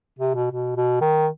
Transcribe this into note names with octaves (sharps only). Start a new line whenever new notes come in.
C3
B2
B2
B2
D#3